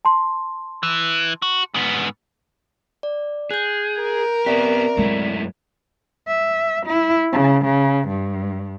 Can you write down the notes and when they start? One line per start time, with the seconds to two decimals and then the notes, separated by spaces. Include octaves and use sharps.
0.05 A5 C6
0.83 E3
1.42 F#4
1.74 G#2 B3
3.03 D5
3.51 G#4 F#6 G6
4.02 A#4
4.46 B3 C4 G4 D5 E5
4.97 F#2 G#3 A3 E4
6.28 E5
6.86 E4
7.32 C#3
7.65 C#3
8.08 G2